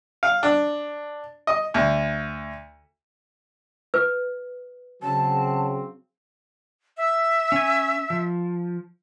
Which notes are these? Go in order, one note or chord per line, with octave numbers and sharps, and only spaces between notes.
F5
D4
D#5
D2
B4
C#3 F#3 C4 A5
E5
C#4 G#5
F3